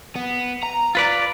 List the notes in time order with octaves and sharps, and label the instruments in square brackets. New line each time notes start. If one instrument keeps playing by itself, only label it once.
[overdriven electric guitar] B3
A#5
[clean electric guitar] F4 B4 D5